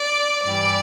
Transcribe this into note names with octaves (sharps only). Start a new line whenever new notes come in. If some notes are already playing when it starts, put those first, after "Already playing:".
Already playing: D5
G2 E3 G3 D5